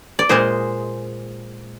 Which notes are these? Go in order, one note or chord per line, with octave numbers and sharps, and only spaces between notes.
D5
A#2 G#3 C5 D#5